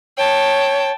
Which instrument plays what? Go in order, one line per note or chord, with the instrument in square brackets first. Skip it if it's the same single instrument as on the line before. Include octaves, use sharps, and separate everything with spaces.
[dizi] C#5 [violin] G5 A5